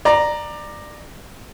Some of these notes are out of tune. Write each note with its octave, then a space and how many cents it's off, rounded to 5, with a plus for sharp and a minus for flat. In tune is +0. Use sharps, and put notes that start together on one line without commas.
D5 +20 A#5 +0